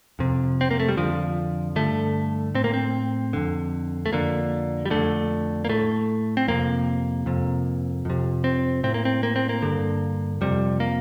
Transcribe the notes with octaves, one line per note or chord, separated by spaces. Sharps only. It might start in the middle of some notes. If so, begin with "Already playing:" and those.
F2 C3
C4
A#3
A3
G3
F2 D3 F3
G2 D3 A3
A2 C4
A#3
C4
F2 D3
A3
F2 D3 A#3
G3
F2 D3 A3
A#3
A2 A3
C4
F2 C3 A#3
F2 C3
F2 C3
C4
A2 C4
A#3
C4
A#3
C4
A#3
G2 D3
F2 C3 G3
A#3